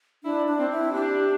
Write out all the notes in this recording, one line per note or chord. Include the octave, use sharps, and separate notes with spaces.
D4 E4
D4
C4
E4
D4 G4